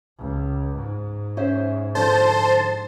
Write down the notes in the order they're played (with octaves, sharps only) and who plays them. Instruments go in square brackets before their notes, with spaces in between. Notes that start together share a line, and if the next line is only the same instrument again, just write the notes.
[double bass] C#2
G#2
[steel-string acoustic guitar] C#4 C5 E5
[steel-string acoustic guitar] D3 F3 [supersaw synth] C5 [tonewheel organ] A5